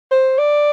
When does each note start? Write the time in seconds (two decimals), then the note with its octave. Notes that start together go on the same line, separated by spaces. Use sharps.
0.11 C5
0.38 D5